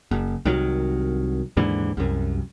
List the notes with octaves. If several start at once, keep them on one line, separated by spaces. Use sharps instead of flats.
F#1
C2 D#3 F#3
D#2 G#2 D3 E3
C2 F#2